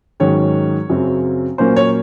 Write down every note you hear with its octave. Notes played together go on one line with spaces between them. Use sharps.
G#2 D#3 F#3 C#4 C#5
F#2 C#3 F#3 C4
A#2 F#3 A#3 C#4 C5
C#5